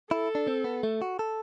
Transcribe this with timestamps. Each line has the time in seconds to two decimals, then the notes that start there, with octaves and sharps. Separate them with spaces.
0.11 E4 A4
0.35 D4
0.47 C4
0.64 B3
0.83 A3
1.02 F#4
1.19 A4